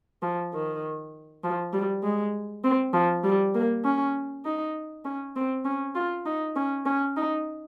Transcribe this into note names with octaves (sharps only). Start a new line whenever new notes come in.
F3
D#3
F3
G3
G#3
C4
F3
G3
A#3
C#4
D#4
C#4
C4
C#4
F4
D#4
C#4
C#4
D#4